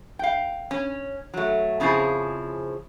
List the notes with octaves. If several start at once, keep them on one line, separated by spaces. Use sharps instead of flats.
F5 G5
C#4
F#3 A3
F2 C#3 F3 E4 G#4